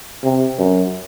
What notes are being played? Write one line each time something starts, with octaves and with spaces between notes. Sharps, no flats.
C3
F#2